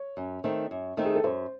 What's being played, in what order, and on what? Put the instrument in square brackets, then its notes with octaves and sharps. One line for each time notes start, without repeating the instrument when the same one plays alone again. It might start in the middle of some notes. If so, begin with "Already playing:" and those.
Already playing: [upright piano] C#5
[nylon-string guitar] F#2
D#3 A3 C4 D#4
F#2
D#3 A3 C4 D#4
[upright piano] G#4
A4
[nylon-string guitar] F#2 [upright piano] C5